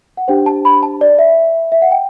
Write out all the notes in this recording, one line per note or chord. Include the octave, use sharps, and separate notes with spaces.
F#5
D4 G4 C5 G5
A5
B5
A5
D5
E5
E5
F#5
G5